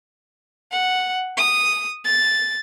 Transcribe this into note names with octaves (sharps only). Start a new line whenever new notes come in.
F#5
D#6
A6